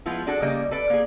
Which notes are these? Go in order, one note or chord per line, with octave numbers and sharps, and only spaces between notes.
F3 G#3 B3 E4 F4
D4 F#4 G#4 A4
C#3 G3 A#3 D#5
A4 B4 D5
A#3 G#4